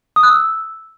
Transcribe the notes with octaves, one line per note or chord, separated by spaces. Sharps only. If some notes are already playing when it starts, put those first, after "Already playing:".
D#6
F#6
E6